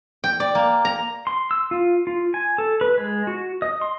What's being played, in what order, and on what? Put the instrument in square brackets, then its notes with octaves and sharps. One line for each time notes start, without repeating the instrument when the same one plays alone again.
[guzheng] G5
D5
A#3
A#5
[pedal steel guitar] C6
E6
F4
F4
G#5
A4
B4
G#3
F#4
D#5
C6